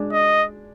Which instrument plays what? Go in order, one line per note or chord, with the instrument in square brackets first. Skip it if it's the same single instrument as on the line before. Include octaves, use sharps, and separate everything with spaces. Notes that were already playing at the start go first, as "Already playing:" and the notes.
Already playing: [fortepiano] G#3 D4
[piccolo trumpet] D#5